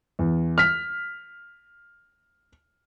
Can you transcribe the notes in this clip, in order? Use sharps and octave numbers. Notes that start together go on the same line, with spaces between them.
E2
F6 B6